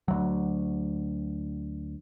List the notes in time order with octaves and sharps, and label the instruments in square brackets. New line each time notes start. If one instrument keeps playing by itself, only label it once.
[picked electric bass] D2 F#3